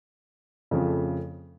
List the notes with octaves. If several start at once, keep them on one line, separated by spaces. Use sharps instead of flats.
F2 C#3 F3 A3